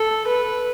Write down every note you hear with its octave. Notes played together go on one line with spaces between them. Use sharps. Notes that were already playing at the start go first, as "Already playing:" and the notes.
Already playing: A4
B4